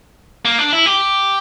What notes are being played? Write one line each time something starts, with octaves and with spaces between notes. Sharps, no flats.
A#3
D4
E4
G4